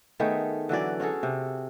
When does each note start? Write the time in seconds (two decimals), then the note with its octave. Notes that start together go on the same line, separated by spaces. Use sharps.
0.19 D#3 A3 B3 G#4
0.69 D3 E3 F#3 D5
1.00 C#4 F#4 G#4 A4
1.23 C3